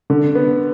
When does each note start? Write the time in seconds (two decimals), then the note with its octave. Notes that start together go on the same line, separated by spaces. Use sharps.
0.10 D3
0.35 B3